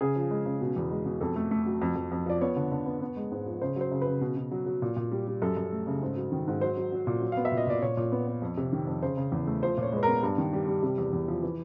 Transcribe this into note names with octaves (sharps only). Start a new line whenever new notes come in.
C#3 G#4
F3
G#3
C#3
B2
E2
G#3
B2
F2 A4
A3
A3
F#3
F2
F2
F2
F3 D5
B3 C#5
D3
D3
B3
B3
G#3
G#2
F3
C#3 C5
F#3 C5
C#3
B4
C#3
B2
B2
F#3
F#3
A#2
A#2
G3
G3
F#2 A4
F#2
A3
C#3
G#2
F#3
D#3
G#2
F#3 C5
F#3
F#3
A#2
F#3
B3 F5
E5
A#2
D#5
A#2 D5
A#2 C#5
A#2
B3
B3
F2
C3
D#3
F2
C#3 C5
C#3
E2
A3
F3 C5
A#2
C#5
G#3 B4
B3 A#4
G2
D#3
G3
G3
C3
E2
E2
F3
E3